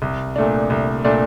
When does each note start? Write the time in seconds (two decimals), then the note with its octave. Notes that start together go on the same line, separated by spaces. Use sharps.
0.02 C2
0.36 A#2 A3 D4
0.70 C2
1.05 A#2 A3 D4